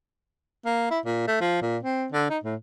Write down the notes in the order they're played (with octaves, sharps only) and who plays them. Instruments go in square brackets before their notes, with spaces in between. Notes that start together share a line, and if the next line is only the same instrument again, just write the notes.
[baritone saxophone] A#3
E4
A#2
A3
F3
A#2
C4
D3
D#4
A2